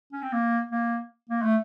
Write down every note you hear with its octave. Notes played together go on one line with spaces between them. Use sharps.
C#4
C4
A#3
A#3
A#3
A3